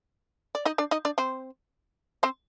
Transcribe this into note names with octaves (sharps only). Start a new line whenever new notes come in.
D5
D#4 D#5
D4 D5
D#4 D#5
D4 D5
C4 C5
C4 C5